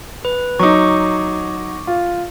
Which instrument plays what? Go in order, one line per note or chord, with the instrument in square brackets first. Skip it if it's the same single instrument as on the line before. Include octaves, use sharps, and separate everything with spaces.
[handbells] B4
[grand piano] F#3 D#4 [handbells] C#6 D6
[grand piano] F4